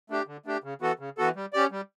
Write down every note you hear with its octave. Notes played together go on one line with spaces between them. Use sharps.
A3 D4 G4
D3
A3 D4 G4
C#3
E3 B3 F#4 A4
C#3
E3 B3 F#4 A4
G3
C#4 G4 D5
G3